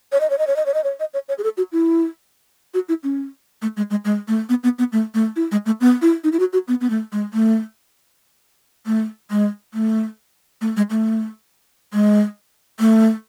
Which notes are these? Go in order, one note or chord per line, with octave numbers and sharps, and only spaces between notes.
C#5
D#5
C#5
D#5
C#5
D#5
C#5
D#5
C#5
D#5
C#5
C#5
G#4
A4
F#4
E4
F#4
E4
C#4
A3
G#3
G#3
G#3
A3
B3
B3
B3
A3
A3
E4
G#3
A3
B3
E4
D#4
E4
F#4
F#4
B3
B3
A3
G#3
A3
A3
G#3
A3
A3
G#3
A3
G#3
A3